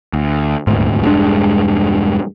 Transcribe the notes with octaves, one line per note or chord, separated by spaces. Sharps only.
D2
D#1 D2 G#2
E1 G2 G#3 D4